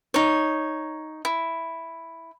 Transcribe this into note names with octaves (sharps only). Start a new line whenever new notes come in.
D#4 C#5
E4